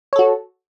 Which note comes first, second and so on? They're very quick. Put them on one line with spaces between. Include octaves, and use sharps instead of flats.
C#5 A4 F#4